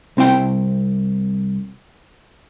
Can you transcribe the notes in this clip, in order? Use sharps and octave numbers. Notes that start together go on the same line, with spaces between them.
C2 C4 E4 G5